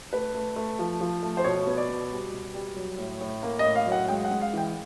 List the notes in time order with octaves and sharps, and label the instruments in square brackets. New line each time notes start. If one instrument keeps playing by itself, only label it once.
[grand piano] A3 B4
A3
A3
F3
F3
A3
C5
B2 C#5
B3
D5
B2
G3
B2
G3
F#3
A2
A2
A#3
D#5
A2
F5
F#3
F#5
G#3 G5
F#5
G#3
F5
E3 G5